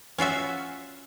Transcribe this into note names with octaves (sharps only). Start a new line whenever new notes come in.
C#4 F4 F#4 E5